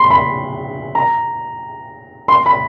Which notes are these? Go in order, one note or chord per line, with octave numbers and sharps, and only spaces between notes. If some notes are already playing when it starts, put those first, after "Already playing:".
Already playing: B5 C6
B5
A#5
C6
B5